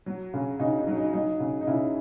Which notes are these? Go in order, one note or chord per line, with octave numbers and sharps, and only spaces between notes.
F#3
C#3
C#3 D#4 F#4
D#4
F#3
D#4
F#3 D#4
C#3
D#4
C#3 E4